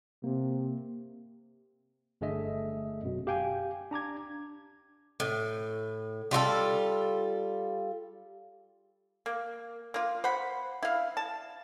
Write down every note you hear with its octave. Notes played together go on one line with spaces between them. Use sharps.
C3 A#3
G1 D3 A3 G#4 D#5 E5
F#2 B2
G4 F5 G5 G#5
D4 A#5 D6 G#6
A2
G3 F4 F#4 A4
A#3
A#3 F4
C5 F#5 B5
E4 F5
A5